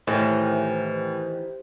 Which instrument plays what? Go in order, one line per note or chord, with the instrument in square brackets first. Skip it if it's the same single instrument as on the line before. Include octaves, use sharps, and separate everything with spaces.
[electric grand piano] A2 [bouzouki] D#3 E3 [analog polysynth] G4 C5